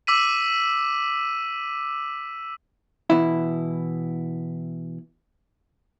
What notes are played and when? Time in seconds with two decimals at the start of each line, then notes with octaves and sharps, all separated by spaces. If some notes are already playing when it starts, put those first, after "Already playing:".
0.07 D6 E6 B6 D#7
3.10 B2 E3 E4